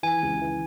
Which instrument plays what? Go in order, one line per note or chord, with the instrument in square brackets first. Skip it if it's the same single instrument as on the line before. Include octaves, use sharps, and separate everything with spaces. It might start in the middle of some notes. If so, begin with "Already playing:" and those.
[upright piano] E3 [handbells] G#5
[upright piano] C#2
E3